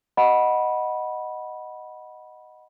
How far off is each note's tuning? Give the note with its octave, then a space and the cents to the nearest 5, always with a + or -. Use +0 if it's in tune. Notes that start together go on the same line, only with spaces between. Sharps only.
D#5 +0 F#5 +0 B5 -15